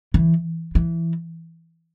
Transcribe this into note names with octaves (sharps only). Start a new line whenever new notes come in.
E3
E3